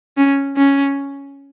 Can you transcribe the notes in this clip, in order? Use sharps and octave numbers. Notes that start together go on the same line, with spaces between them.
C#4
C#4